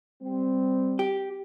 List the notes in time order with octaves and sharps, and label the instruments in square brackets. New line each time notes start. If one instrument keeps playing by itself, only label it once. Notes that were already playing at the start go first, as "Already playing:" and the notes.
[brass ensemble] G3 C4
[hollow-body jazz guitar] G4